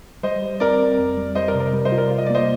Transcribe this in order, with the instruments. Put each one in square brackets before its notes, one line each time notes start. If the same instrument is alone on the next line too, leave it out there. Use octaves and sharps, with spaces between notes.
[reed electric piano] G3 [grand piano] C5 D#5
[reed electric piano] G3
[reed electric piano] C4 [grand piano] A#4 D5
[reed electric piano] C4
F2
G3
[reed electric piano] G3 [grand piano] C5 D#5
[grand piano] A#4 D5
[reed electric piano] C3
[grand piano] A#4 D5
[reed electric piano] G3
[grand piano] C5 D#5
[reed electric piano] F4
[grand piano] A#4 D5
[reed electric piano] F4
[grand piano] D#5
D5
[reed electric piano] A#3 [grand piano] C5 D#5